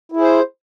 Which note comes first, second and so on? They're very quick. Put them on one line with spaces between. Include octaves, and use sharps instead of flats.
E4 G#4 C5